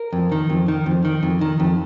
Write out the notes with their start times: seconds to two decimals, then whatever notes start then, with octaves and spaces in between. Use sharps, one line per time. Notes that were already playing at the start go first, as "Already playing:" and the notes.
Already playing: A#4
0.13 F2
0.32 D#3
0.50 F2
0.68 D#3
0.86 F2
1.05 D#3
1.23 F2
1.41 D#3
1.60 F2